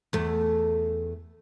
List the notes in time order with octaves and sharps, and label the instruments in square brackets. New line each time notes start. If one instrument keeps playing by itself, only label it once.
[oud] E2 A3